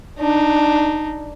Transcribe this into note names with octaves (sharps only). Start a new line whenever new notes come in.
D4 D#4